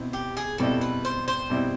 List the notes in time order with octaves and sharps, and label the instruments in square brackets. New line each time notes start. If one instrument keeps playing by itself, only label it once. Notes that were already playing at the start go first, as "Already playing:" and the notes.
Already playing: [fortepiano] B2 C4 E4
[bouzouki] G4
G#4
[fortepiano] B2 G3 C4 E4 [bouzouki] A4
[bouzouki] B4
C5
C5
[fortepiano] B2 G3 C4 E4